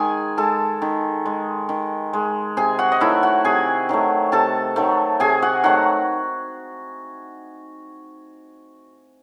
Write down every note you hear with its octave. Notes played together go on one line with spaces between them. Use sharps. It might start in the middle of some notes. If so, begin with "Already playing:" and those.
Already playing: D#3 G#3 G#4 G#5
G#3 A4 A5
D#3
G#3
D#3
G#3
C3 G#4 G#5
F#4 F#5
D#5
D#3 F#3 A3 E4 E5
F#4 F#5
C3 G#4 G#5
D#3 F#3 A3
C3 A4 A5
D#3 F#3 A3
C3 G#4 G#5
F#4 F#5
D#3 F#3 A3 F#4 F#5